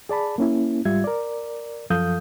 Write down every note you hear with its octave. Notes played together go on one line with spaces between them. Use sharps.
G#4 D5 A5 B5
A#3 C#4 E4
G#2 G3 F4 E5 G#6
A#4 D5
F#2 F3 A4 F5 D#6 G6